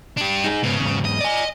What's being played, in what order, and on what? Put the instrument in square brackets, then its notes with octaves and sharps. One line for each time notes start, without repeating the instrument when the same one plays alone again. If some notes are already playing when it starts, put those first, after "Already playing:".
[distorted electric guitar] D4 G4
[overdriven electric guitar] D#4 G#4
[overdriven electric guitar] G#2 B3 [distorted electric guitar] C#3
[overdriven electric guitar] E2 G#2
[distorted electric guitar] D#5
[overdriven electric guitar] D5 G#5